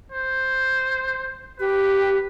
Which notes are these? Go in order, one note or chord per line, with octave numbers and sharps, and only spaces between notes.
C5
G4 B4